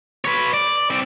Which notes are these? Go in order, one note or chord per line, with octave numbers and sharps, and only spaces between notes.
B4 C#5
D5
C4 D5